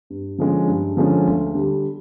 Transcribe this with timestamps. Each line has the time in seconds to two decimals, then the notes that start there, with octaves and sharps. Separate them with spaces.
0.10 G2
0.38 D3 F3 G#3 C#4
0.68 G2
0.97 D3 F3 G#3 C#4
1.27 D2
1.55 D3 G3